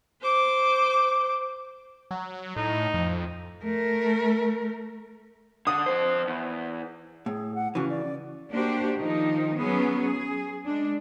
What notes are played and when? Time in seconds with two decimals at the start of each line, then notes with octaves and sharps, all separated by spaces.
0.22 C5 D6
2.11 F#3
2.56 A2 D#4
2.94 F2
3.63 A3 A#4
5.67 D3 D#6
5.86 F2 C5
6.27 E2
7.26 A2 G#4
7.55 F#5
7.75 C#3 E3 F#4
7.90 D5
8.51 A#3 D4 F#4 G4 C5
8.97 D#3 F3 D#4
9.56 F#3 B3 C#4 G#4
10.02 G#4
10.65 G#3 D4